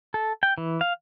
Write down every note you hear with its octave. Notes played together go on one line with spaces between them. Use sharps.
A4
G5
E3
F5